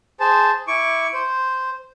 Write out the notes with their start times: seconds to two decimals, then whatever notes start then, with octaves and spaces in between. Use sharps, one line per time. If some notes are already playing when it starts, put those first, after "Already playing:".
0.20 G#4 C5 A5
0.68 E4 C#6 D6
1.13 C5